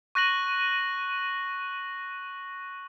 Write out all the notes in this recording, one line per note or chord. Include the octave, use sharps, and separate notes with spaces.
C#6 F#6 A#6 D#7 F#7